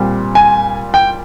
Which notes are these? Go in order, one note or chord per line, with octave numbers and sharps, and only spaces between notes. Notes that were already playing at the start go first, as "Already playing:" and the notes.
Already playing: A#2 G3 C4
G#5
G5